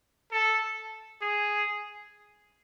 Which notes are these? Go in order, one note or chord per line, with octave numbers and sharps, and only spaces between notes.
A4
G#4